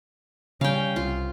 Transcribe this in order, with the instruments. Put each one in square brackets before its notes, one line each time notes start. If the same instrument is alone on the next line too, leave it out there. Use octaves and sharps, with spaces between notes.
[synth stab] C#3 [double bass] G3 C#4 [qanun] F5 G5
[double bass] C2 [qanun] F4